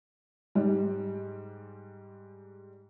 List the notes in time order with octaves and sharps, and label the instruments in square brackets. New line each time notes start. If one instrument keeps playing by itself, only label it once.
[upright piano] G#2 G3